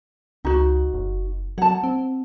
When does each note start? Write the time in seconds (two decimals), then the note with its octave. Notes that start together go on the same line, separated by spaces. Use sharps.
0.45 C#2 D#4 F#4
0.94 F#1
1.58 F#3 F#5 A5
1.84 C4